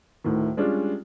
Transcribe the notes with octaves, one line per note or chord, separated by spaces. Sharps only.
D2 A2 D#3
G3 G#3 C#4 D4 F4